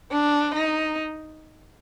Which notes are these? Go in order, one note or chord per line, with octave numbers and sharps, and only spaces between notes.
D4
D#4